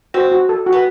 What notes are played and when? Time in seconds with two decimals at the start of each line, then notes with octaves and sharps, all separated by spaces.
0.14 C4 F#4
0.32 F#4
0.49 A4
0.66 F#4
0.72 B3